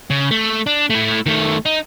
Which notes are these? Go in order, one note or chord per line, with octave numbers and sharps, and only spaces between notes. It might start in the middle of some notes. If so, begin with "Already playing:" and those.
C#3
A3
D4
A3 E4
D#3 A3
D#4